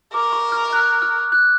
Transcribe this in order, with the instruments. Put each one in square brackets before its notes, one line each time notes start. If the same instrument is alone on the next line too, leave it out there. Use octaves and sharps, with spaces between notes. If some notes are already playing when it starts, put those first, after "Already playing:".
[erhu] A#4 [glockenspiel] D6
[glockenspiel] C#6
F6
F#6
F6
F#6